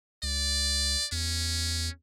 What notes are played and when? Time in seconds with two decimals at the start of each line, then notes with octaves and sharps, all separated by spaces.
0.23 C#2 D5
1.12 E2 C#4